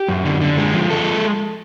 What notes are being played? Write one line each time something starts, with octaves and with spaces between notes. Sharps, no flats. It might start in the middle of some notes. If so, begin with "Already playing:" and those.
Already playing: G4
F#2
D3
D3
G#3
F3
G#3 A4